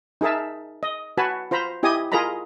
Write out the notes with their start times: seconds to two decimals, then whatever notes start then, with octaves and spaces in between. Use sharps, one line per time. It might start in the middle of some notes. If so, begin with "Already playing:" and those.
0.21 D#4 G#4 A#4 E5 A5
0.83 D#5
1.18 F#4 B4 G#5 A5 B5
1.51 F4 C5 A#5 B5
1.83 E4 G4 D#5 G#5 D#6
2.12 F4 G#4 A#4 D#5 A#5 B5